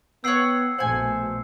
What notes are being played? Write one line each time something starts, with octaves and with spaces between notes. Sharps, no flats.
B3 C#5 F#5 G5 E6 C7 C#7
A#1 B2 A3 C5 F#5 G#5